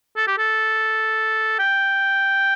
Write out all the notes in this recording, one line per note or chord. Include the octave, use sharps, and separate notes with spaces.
A4
G4
A4
G5